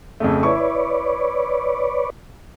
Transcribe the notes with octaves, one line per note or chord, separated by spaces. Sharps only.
F2 C#3 A3
E4 B4 C#5 D5 C#6